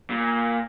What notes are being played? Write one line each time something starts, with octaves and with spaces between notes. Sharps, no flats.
A#2